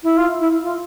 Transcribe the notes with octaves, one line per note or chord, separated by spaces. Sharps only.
E4
F4
E4
F4